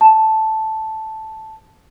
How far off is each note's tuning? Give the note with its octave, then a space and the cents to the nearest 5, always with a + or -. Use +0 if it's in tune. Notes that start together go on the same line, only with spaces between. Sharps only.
A5 -5